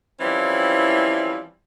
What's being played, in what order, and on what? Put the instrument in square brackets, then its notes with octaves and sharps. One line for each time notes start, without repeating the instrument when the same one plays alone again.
[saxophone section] E3 F3 G3 C4 C#4 E4